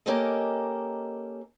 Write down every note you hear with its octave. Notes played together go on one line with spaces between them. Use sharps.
A#3 C#4 G4 A4 A#4 D#5